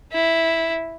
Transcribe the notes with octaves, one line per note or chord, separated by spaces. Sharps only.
E4